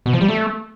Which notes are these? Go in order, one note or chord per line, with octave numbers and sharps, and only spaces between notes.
B2
F3
G3
A3